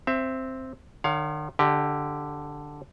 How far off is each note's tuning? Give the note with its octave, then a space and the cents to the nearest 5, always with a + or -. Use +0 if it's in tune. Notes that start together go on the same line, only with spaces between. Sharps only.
C4 +0 E5 +20
D#3 -45 C#5 +30 F5 +15
D3 +0 G4 +0 D#5 -45